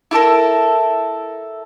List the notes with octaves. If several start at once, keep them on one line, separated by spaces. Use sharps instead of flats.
E4 G4 A4 A#4